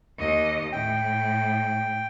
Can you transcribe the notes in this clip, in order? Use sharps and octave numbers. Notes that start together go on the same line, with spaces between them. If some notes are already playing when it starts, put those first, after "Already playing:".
D#2 D#5
A2 G5